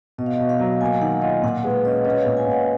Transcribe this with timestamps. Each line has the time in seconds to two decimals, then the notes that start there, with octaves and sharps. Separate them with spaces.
0.18 B2 D#5
0.26 F5
0.34 D#5
0.40 B2
0.49 F5
0.60 F#3
0.81 A#3 G#5
1.01 D#3 F#5
1.22 F4 D#5
1.43 A#2 F#5
1.64 G#3 B4
1.85 C#4 D#5
2.05 C#4 C#5
2.20 F5
2.26 A#2
2.37 G#5
2.47 A#2 F#5